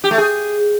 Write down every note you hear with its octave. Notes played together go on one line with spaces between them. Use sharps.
G4
A3
G#4